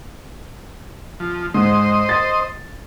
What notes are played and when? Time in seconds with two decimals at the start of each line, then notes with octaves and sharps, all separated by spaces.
1.20 F3
1.54 G#2 C5 D#5
2.09 A6